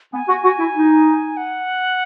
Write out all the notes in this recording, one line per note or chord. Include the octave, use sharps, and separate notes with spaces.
B3 G#5
F#4
F#4
E4
D#4
F#5